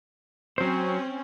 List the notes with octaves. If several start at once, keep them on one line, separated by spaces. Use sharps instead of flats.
F#3 C4 C#4 C5